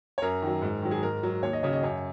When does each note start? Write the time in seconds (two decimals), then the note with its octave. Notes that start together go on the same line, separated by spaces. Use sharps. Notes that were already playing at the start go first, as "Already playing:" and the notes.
0.18 C#5
0.22 F#2 A#4
0.42 D#3 F#3
0.62 G#2
0.82 D#3 F#3
0.91 G#4
1.03 G#2 A#4
1.23 F#3
1.43 D#2 C#5
1.53 D#5
1.63 C#3 F#3 C#5
1.73 D#5
1.83 F#2 C#5